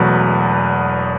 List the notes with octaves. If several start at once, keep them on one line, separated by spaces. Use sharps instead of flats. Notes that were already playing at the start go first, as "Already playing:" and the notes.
Already playing: E1 E2 B2 F#3 A3 B4